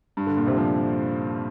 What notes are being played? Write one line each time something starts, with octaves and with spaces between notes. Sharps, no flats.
G2
D3
A#2
C3
F3